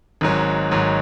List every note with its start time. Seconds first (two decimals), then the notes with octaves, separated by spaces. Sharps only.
0.21 G#1 G#2 F#3
0.71 G#1 G#2 F#3